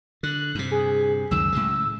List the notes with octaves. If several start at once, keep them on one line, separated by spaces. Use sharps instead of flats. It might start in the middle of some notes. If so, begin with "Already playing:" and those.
D3 F#6
G2 C3
G#4
C#2 F#2 D#3 E6
A2 C#3 G#3